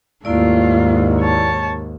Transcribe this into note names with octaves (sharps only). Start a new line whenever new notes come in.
D#2 G#2 A3 A#3 E4 F4 D5
C#5 A5